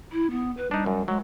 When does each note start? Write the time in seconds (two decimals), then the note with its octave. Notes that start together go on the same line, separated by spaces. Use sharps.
0.12 E4
0.31 B3
0.57 B4
0.71 G3 D4 D#4
0.86 F#2
1.08 F#3 G#3